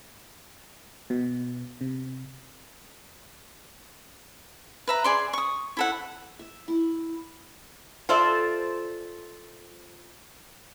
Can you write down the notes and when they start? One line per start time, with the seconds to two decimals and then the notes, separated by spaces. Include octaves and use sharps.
1.10 B2
1.81 C3
4.87 B4 E5 A#5
5.04 G#4 D5 C6
5.33 C#6 D#6
5.77 E4 A4 F#5
6.39 E5
6.68 E4
8.09 F4 A4 C5 D5 E5